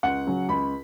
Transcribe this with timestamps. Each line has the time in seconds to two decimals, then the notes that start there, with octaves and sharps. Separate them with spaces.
0.03 C#2 F#5
0.27 C#3 F#3
0.49 C#2 B5